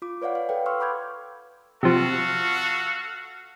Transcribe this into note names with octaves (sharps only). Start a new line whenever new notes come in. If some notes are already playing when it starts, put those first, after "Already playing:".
F4 D6
B4 C#5 D5 F5 F#5
F5
A4 B4 G5
C6 C#6 E6 F6
B5 D6 G6 G#6
C3 F3 F#4 A4 F5